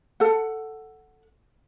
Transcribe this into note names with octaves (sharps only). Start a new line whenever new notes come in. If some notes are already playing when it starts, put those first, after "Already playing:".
A4 F#5